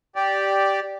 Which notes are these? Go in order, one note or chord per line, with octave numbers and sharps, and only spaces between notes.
G4 D5